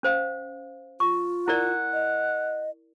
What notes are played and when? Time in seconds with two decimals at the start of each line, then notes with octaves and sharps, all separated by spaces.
0.03 C#4 C5 F5
1.00 F4 C#6
1.48 E4 A#4 D5 F#5
1.93 D#5